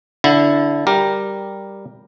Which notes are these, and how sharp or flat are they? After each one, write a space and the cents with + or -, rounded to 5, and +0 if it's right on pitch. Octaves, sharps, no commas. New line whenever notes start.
D3 -15 E4 +0
G3 +0 G4 +0 A#4 +0